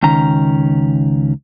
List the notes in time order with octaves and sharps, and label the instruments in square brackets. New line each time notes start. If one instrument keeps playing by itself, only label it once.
[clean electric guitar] C#2 D#3 C#4 A#5